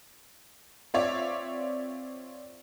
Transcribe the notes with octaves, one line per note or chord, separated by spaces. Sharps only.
C4 F4 C#5 D5 E5